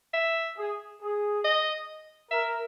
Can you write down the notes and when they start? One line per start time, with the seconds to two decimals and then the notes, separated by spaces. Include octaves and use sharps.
0.13 E5
0.57 G#4
1.01 G#4
1.44 D#5
2.31 A#4 E5